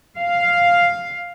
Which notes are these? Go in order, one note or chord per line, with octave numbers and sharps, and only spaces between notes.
F5